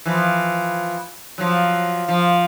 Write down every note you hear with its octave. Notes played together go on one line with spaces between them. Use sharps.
E3 F3
F3 F#3
F3